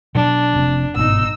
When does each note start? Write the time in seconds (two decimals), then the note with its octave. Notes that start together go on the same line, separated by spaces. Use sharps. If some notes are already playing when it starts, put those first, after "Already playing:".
0.15 B2 F#3 D4
0.54 F1 C3
0.95 G1 G#2 B2 D#4 E6